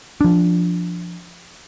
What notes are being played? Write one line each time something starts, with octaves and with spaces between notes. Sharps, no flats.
F3 D4